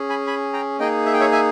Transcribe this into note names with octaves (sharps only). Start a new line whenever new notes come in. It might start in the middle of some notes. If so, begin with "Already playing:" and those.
Already playing: C#4 G#4
G#5 B5
G#5 B5
G5 A#5
A#3 D#4 G#4 D#5 G5
E5
G5
C#5 E5
E5 G#5